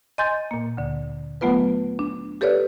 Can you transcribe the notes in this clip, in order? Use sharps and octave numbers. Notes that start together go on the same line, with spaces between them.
D#5 G#5 C6 G6 A6
A#2 A#3
D2 D3
F#3 A3 B3 F4 B4
D4
G4 A4 B4 C#5 D5